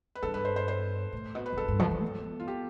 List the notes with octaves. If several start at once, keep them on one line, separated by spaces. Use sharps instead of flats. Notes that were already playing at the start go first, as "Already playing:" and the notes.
B4
G2 A4
B4
C5
C5
C5
A2
B2
B4
F2
G2 A4
G2
F3
F3
B3
F4
G4